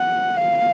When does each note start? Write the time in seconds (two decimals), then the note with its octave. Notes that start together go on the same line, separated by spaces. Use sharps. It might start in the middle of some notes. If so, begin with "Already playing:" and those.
Already playing: F#5
0.36 F5